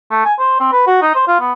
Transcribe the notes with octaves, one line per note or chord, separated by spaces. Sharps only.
A3
G#5
C5
C4
B4
F#4
D#4
C5
F4
B3